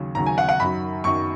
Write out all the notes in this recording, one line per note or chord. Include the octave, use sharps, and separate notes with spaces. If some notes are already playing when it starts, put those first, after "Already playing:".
Already playing: D#2 C#3 F#3
D#2 C#3 F#3 A#5
G#5
F#5
F#5
F#2 D#3 F#3 B5
F#2 D#3 F#3 C#6